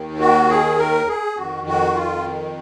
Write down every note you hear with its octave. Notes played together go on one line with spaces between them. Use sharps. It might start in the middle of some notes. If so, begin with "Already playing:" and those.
Already playing: D#2 D#3
F#4
G#4
A#4
G#4
F2 D#3 F#4
F#4
F4